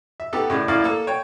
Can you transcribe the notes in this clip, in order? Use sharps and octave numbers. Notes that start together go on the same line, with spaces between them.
E5
B3 D#4 G4 A4
A2 C#3 D4
F#2 A2 A#3 E4 D5 F5
A#3 A4
C#5 G5